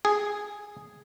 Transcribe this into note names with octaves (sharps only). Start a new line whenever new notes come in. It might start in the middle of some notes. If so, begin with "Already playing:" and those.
G#4